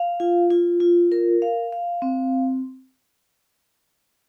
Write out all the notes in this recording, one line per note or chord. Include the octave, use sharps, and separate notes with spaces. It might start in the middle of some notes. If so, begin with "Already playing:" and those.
Already playing: F5
F4
F4
F4
A#4
F5
F5
C4